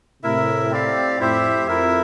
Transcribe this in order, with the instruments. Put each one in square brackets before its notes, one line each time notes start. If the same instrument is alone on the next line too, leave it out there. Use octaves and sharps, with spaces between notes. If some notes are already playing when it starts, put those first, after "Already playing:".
[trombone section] A2 C3 [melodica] E4 A#4 E5
[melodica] C4 G4 D5 F5
[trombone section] F2 A2 [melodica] E4 G4 C5 E5
[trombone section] F2 [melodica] E4 A#4 E5